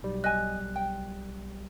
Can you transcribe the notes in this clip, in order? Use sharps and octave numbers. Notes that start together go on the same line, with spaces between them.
B1 G3
D#5 G#5 F#6
G5